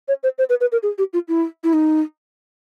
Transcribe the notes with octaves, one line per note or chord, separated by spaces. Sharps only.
C#5
C5
C5
B4
B4
A#4
G#4
G4
F4
E4
E4
D#4